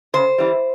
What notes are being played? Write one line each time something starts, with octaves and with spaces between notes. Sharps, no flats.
C#3 C5
E3 G3